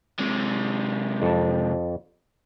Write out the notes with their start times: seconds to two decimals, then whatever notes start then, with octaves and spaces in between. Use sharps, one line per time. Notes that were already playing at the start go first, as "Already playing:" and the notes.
0.19 C3 G#3
1.22 F2 A5